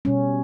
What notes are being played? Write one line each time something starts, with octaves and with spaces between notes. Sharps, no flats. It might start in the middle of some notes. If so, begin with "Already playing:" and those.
B2 G3 C#4